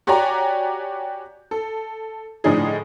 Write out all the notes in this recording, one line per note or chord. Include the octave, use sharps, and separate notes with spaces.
F#4 G4 C#5 D5 G#5 A#5
A4
A2 D3 F3 D4 D#4 G#4